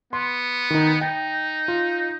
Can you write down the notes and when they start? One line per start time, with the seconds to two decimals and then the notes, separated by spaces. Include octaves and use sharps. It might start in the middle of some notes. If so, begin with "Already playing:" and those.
0.13 B3 C6
0.70 D#3 D#4
1.01 D#4 G5
1.68 F4